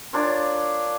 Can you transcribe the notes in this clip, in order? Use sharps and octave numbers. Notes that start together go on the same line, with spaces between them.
D4 F4 A#4 C#5